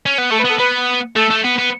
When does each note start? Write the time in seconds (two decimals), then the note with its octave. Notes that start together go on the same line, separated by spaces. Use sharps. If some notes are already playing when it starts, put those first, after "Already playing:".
0.06 C#4
0.18 B3
0.30 A3 A4
0.40 B4
0.45 B3 A4
0.58 B3 B4
1.16 A3 A4
1.31 A3
1.45 B3
1.59 B3